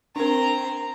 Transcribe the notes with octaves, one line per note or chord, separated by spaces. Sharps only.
C4 D4 A#4 A#5